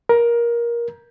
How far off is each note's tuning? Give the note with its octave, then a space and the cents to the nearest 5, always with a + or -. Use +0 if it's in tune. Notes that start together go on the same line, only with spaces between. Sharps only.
A#4 +20